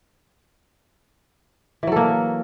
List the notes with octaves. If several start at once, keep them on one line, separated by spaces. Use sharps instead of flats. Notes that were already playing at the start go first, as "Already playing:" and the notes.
E3 F#3 A#3 A4